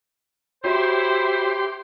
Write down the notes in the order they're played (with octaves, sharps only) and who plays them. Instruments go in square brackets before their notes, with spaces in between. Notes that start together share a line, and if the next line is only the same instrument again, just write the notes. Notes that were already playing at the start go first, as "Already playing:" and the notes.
[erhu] E4 [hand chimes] F#4 C#5 [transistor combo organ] G4 C6 [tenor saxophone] C5